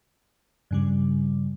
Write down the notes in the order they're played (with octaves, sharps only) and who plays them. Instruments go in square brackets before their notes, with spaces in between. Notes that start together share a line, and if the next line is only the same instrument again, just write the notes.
[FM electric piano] G2 C#3 G3